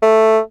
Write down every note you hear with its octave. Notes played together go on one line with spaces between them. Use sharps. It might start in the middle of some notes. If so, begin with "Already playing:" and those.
A3